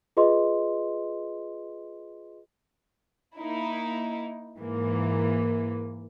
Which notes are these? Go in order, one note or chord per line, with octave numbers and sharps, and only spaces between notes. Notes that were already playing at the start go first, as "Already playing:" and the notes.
F4 G#4 B4 D#5 C6
A#3 D#4 E4
G#2 E3 A#3